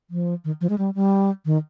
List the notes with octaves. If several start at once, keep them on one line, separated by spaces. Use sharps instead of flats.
F3
D#3
F3
G#3
G3
G3
D#3